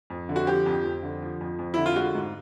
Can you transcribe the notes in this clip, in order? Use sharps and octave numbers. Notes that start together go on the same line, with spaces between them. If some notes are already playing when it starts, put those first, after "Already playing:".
F2
D3
F#4
F3 G4
F2
F2
D3
F3
F2
F2
D3 E4
F4
G#3 F#4
G#2